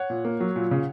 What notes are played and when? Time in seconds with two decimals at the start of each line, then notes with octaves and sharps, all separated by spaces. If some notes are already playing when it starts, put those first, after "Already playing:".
Already playing: C#5 F#5
0.10 A#2
0.25 A#3
0.40 F#3
0.56 A#2
0.71 C#3